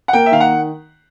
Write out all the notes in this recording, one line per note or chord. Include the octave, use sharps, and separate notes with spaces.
F#5
A#3 G5
E5
D#3 F5
F#5